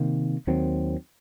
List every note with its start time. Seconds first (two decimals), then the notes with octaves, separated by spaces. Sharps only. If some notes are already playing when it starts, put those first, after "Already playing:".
Already playing: C3 D#3 A#3
0.47 D#2 D#3 F#3 C4